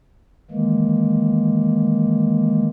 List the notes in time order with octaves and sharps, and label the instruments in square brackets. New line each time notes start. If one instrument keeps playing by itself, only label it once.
[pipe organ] D#3 E3 G#3 A#3